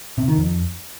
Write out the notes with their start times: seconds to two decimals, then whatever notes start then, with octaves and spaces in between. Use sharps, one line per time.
0.18 C3
0.28 D#3
0.38 F2